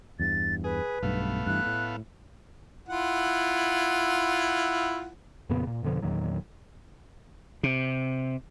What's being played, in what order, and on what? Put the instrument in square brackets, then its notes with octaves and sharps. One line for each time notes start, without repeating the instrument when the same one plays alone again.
[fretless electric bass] E2 G2 [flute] A6
[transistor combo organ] G#4 [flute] B4
[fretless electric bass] B1 G2 [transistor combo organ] A3 B3 F5
[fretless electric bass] G2 E3 [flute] F#6
[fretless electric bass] A2
[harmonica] E4 F4 F#5
[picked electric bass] F2 A#2 C#3 B3
A#2
F2 B2 D3 F3
E2 A#2 D#3 F#3
[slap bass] C3